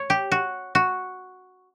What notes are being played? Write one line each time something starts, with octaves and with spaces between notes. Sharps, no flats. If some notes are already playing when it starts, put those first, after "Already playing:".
Already playing: C#5
G4
F#4
F#4